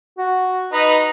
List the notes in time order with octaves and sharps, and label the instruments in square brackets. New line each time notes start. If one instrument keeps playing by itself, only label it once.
[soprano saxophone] F#4
[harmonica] D#4 B4 [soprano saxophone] D#5